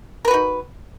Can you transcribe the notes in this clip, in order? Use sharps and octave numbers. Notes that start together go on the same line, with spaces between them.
D#4 F#4 A#4 B4